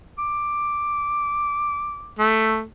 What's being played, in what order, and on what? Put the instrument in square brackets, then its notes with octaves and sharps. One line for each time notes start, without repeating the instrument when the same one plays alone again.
[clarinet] D6
[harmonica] A3